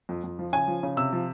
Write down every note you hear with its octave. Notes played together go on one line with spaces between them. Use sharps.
F2
F2
F3
C#3 G#5
F3
C#3
C3 E6
F3